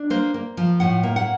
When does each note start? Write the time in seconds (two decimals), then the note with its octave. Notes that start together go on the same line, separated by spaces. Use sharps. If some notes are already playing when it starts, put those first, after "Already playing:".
Already playing: D4
0.10 A#3 C5
0.34 A#3
0.57 F3
0.80 A2 F#5
1.03 A#3
1.16 F#5